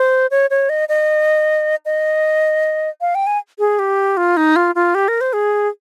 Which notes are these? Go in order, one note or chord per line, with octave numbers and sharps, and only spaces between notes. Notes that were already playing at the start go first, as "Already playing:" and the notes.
Already playing: C5
C#5
C#5
D#5
D#5
D#5
F5
G5
G#5
G#4
G4
F4
D#4
F4
F4
G4
A#4
C5
G#4